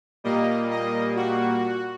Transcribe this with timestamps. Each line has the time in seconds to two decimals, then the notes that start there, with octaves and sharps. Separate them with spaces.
0.24 A#2 G3 A#3 D#5
0.71 D#5
1.16 F#4